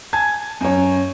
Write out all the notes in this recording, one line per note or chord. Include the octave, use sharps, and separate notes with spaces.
G#5 A5 G#6
F#2 C#5